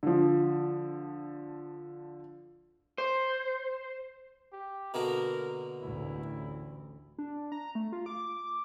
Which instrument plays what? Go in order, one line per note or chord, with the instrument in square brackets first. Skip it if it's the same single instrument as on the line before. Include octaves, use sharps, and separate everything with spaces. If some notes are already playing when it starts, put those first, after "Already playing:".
[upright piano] D3 F3
[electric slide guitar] C5
[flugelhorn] G4
[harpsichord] B2 D3 A#3 [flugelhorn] A#4
[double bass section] A1 D2 [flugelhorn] E4
[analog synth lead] D4
A#5
A3
F4
D6